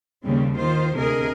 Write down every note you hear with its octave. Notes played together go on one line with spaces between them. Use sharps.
D#2 C#3 G3 C4
D#3 F4 C5
D2 C3 G#4 A#4 D#5